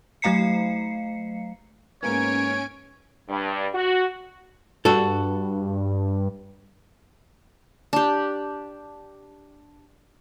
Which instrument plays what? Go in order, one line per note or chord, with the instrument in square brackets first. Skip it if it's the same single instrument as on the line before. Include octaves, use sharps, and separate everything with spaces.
[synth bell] F#3 A3 F5 A#5 C7 C#7
[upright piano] G#2 A#3 B3 [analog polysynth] C#4 G#5 D7 [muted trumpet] C#5
[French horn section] G2
F#4
[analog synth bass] G2 [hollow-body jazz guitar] F#4 A4
[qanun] D4 G4